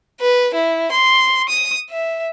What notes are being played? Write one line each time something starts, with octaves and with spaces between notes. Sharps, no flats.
B4
E4
C6
D#6
E5